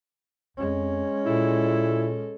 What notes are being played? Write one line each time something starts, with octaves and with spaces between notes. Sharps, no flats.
F2 G#3 C#4
A#2 E4 A4